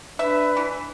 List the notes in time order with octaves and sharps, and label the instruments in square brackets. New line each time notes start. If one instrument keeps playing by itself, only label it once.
[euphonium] D4 [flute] B4 [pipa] E5
[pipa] E3